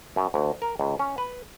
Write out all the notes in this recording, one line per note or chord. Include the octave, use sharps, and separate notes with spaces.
F#2
D2
A#4
C#2
C#4
B4